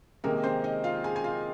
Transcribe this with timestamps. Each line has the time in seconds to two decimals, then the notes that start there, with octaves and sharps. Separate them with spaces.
0.24 C3 D#3 G#3 A#3 A#4
0.44 C4 C5
0.64 D#4 D#5
0.84 F4 F5
1.04 G#4 G#5
1.16 G#5
1.24 F4 F5